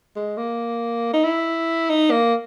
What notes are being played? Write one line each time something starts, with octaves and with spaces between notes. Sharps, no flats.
G#3
A#3
D#4
E4
D#4
A#3